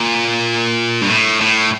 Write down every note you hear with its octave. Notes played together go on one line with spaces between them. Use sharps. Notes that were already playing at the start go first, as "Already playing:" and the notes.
Already playing: A#2
G2
A2
A2